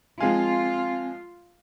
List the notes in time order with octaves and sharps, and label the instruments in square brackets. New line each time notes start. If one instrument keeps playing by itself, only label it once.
[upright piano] F3 G#3 F5 [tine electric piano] C4 G#5 [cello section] F4